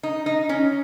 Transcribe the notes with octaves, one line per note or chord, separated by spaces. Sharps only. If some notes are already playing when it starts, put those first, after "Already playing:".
D#4
D#4
C#4